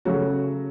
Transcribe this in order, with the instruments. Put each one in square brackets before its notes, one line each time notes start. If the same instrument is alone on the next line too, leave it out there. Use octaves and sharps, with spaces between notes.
[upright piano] C#3 F#3 A3 C#4 F#4